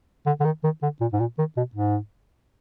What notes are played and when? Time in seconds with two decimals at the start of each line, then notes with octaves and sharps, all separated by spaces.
0.26 D3
0.40 D3
0.45 D#3
0.64 D#3
0.82 D3
1.01 A#2
1.12 G#2
1.20 A#2
1.38 D#3
1.57 B2
1.75 G#2